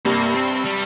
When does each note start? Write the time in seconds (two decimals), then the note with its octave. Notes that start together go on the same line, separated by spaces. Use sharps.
0.05 G2 C3 A#3
0.35 C4
0.65 G3